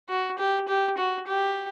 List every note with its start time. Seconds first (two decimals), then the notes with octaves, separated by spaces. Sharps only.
0.09 F#4
0.38 G4
0.68 G4
0.98 F#4
1.27 G4